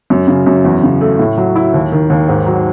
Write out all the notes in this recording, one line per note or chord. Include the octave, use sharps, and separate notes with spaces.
F#2
C#3
F#2
E2
C#3
A3
A2
F#3
E4
D#2
D#3
D#2
G#2
F#3